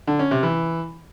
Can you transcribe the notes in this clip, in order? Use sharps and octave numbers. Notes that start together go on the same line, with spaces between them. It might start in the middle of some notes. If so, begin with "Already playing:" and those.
D3
C#4
C3
E3